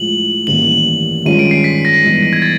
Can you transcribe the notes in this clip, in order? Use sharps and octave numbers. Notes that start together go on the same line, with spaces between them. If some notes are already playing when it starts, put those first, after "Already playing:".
Already playing: A2 F3 G#3 F#7
A1 G2 D#3 G3 A#3 F#7
G2 D#3 G#3 C#4 F4 D#7
D7
C7
B6
A#6
G2 E3 G#3 B3 D#4
G#6
A6